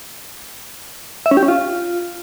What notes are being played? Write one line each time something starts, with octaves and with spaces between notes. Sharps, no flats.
E5
C#4
G4
C#4
F4